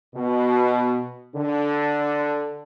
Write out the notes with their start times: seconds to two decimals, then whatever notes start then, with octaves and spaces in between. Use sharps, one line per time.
0.15 B2
1.35 D3